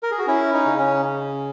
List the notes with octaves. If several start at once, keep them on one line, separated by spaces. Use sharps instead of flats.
A#4
G#4
F#4
C#4 E4
D#4
C#3
C#4